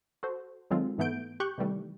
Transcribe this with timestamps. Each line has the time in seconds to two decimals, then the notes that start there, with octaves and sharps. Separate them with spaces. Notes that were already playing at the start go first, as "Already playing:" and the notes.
0.23 F#4 A4 C5
0.71 D#3 F#3 G#3 C4 F4 A4
0.98 G#2 E3 A3 B3 G6 D7
1.40 G4 C#6 F#6 G6
1.58 C3 D#3 E3 G3 A3